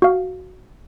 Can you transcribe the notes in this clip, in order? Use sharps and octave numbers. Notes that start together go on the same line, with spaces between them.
F#4 F5